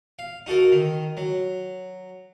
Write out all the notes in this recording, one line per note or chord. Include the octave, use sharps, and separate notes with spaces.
F5
D#4 F#4 A4 A#4
D#3
F#3